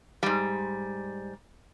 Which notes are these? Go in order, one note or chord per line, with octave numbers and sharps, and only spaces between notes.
G#2 G3